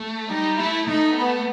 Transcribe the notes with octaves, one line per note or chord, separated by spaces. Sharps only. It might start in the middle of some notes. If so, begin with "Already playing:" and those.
Already playing: A3
G3 D#4
A3 E4
A3 D#4
B3